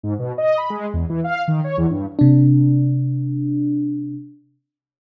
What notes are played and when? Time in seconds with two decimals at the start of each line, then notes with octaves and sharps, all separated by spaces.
0.03 G#2
0.19 B2
0.38 D#5
0.58 B5
0.70 G#3
0.94 E2
1.10 E3
1.24 F5
1.48 D#3
1.64 C#5
1.78 E2
1.90 G2
2.19 C3 D4